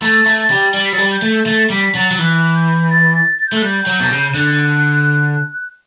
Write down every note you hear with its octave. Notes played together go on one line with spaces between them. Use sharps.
A3 A6
A3
A6
G3
G3 A6
B6
F#3 A6
G3
G6
A3
A3 A6
G3 B6
F#3 A6
F#3
E3 F#6
G6
A6
A6
A6
G6
A3 F#6
G3 G6
F#3
B2
C#3
D3 F#6